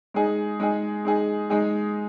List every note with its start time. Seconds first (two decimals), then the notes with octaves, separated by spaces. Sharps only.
0.14 G#3 D#4 G#4
0.60 G#3 D#4 G#4
1.05 G#3 D#4 G#4
1.50 G#3 D#4 G#4